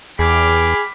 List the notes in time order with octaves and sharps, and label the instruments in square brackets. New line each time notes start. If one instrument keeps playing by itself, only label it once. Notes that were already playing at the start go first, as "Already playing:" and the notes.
[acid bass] E2 [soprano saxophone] G#4 [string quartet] G5 D6 F6 [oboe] B5